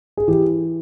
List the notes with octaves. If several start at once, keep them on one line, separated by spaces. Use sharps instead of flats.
G#4
E3 G4